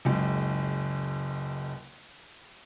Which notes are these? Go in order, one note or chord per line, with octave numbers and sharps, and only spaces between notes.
F#1 C#2